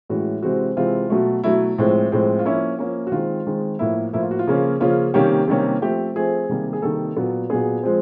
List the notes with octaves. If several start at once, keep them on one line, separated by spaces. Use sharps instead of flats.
A2 E3 G#3 C#4 F#4
C3 E3 G#3 C4 F#4
C3 E3 G#3 C4 F4
B2 F#3 A3
B2 F#3 A3 E4
A2 F3 G#3 C4
A2 F3 G#3 C4
F4
F3 A#3 C#4 E4
F3 A#3 C#4
F#4
D#3 G#3 C4 F4
D#3 G#3 C4
A2 F3 A#3 E4
A2 F3 A#3 E4
F4
F#4
F4
C#3 F3 A#3 C#4
C#3 F3 A#3 C#4 F4
C3 D#3 G3 A#3 C#4 G4
C3 D#3 G3 A#3 C#4
F3 A3 C4 G4
F3 A3 C4 G#4
C3 D#3 G3 A#3
G#4
C3 D#3 G3 A#3 A4
A#2 F#3 B3
A#2 F#3 B3 G#4
F3 G#3 C4